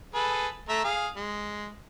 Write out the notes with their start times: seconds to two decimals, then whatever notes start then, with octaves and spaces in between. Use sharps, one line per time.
0.14 G#4 A4 B4
0.69 A3 E5 A#5
0.84 G#4 F5
1.16 G#3